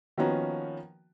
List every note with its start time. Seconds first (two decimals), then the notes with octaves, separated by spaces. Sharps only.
0.18 D#3 F3 A#3 B3 C#4 F#4